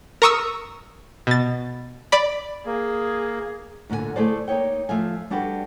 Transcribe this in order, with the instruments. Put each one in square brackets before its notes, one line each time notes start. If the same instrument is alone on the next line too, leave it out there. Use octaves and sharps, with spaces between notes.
[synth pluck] A#4 A#5 C#6 D#6 E6
B2 A6
D5 B5
[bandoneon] A#3 [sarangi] G#4
[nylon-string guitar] D2 A#2 D3 F4 G#5
A3 E4 G#4 A4 C5 D5
A#3 D#4 C#5 G5
F3 A3 E5 F5 G#5
G3 D4 F#4 G4 A4 B4